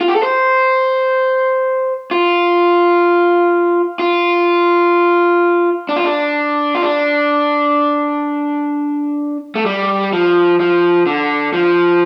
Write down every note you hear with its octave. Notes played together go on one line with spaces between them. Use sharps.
F4
G4
A4
C5
F4
F4
D4
F4
D4
F4
D4
A3
G3
F3
F3
D3
F3